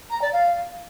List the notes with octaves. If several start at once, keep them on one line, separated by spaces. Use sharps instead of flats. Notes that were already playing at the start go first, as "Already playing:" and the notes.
A#5
D5
F5